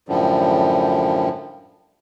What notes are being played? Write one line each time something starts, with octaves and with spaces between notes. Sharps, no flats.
F#2 A2 D3 F3 G3